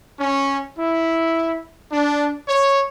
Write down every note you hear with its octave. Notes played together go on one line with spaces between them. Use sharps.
C#4
E4
D4
C#5